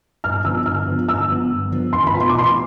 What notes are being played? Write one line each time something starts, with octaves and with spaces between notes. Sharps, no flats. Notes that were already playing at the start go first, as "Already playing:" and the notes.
G2 F6
D3 F3 B3 E6
G2 F6
D3 F3 B3
G2 E6
D3 F3 B3
G2
D3 F3 B3
E2 C6
B5
B2 B3 F4
C6
D6
E2 C6